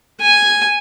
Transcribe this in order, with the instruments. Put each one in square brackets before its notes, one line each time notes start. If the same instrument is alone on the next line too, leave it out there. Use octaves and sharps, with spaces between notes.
[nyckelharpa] G#5